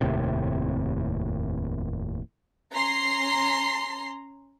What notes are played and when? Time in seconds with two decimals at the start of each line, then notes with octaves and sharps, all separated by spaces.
0.01 F1 D#2 A2 C3
2.73 C#4 A#5 C6 C7